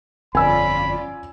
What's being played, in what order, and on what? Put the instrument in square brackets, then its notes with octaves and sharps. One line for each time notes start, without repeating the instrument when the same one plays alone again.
[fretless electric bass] G1 F2 [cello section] C#4 F4 D5 [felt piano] G#5 E6 [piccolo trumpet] B5